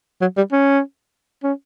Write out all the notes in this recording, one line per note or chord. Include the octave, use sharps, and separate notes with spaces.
F#3
G3
C#4
C#4